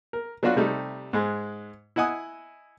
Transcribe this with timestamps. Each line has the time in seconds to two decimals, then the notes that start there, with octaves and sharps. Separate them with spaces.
0.13 A#4
0.43 F#3 B3 D4 F4 F#4
0.56 C3 G3 A3 D#4
1.13 G#2 G#3
1.96 E4 D#5 F#5 G#5 D#6